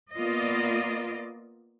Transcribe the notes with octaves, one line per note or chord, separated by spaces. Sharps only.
A#3 B3 F4 D5 D#5